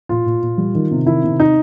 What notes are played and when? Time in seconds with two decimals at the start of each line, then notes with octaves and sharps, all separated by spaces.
0.09 A#2 F4
0.26 A#2
0.42 A#2
0.58 G3
0.75 D#3
0.91 C3
1.06 D#3 E4
1.24 C3
1.40 D#4